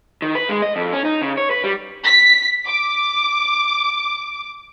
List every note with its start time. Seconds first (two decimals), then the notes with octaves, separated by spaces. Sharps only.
0.22 D#3
0.35 B4
0.49 G#3
0.62 D#5
0.76 F2
0.93 C#4
1.05 D#4
1.22 C#3
1.38 C#5
1.51 B4
1.64 G3
2.05 B6
2.67 D6